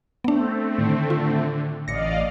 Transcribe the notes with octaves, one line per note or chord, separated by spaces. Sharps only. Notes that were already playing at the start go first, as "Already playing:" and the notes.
A3 B3 C4 D4
A2 D3 D#3
F4
A1 D5 D#5 F5 A#6 C#7